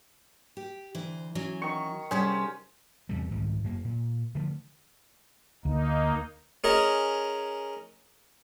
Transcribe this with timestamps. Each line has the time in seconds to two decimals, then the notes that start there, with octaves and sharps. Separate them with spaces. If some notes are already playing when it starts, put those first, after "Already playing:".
0.57 G4
0.95 D2 E3 C5
1.35 E3 F#3 C#4
1.62 D#3 C#6
2.11 C3 G3 C#4 G#4 A4 C5
3.09 E2 C3 G3
3.31 C2 G#2 D#3
3.64 F#2 A#3
3.85 A#2
4.35 D3 F3 A3
5.65 D2 A#3 D#4
6.64 C#4 G#4 A#4 D#5